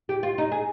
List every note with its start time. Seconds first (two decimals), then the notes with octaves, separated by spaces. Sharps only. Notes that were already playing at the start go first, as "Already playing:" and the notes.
0.09 G4
0.23 F4
0.38 D#4
0.52 G#4